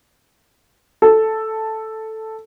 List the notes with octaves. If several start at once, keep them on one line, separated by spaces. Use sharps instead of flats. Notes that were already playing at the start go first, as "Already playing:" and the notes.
A4